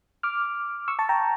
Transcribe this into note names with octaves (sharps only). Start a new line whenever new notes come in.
D6 F6
C#6 E6
A5 C#6
G5 A#5